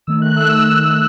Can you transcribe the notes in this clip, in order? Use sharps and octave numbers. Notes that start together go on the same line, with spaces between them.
D#3 A3 E6
F#6
E6